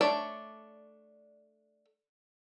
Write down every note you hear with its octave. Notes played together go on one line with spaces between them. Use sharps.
A3 D4 C#5 D5